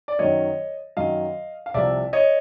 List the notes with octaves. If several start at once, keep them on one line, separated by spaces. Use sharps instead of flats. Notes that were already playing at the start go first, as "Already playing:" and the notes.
D5
F#2 D#3 F#3 C#5 D#5
F#2 D#3 F#3 D#5 F5
F5
C2 C3 F3 D5 E5
C#5 D#5